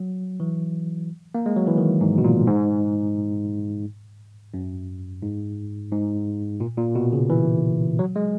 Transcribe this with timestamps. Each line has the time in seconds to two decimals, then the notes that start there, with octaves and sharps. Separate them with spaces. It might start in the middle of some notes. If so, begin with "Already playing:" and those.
Already playing: F#3
0.40 E3
1.35 A#3
1.46 G#3
1.56 F#3
1.67 E3
1.78 D#3
2.01 G#2
2.18 B2
2.24 A#2
2.47 G#2
4.54 F#2
5.22 G#2
5.92 G#2
6.60 A#2
6.78 A#2
6.95 B2
7.13 C#3
7.30 E3
7.99 F#3
8.16 G#3